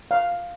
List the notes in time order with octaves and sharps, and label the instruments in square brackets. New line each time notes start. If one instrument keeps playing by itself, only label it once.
[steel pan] F5